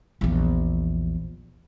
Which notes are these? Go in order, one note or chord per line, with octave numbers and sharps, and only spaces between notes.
A#1 E2